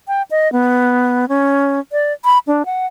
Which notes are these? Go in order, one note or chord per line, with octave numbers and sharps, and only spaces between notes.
G5
D#5
B3
C#4
D5
B5
D4
F#5